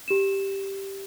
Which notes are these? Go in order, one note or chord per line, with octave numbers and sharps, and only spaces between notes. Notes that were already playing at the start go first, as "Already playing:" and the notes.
G4 E7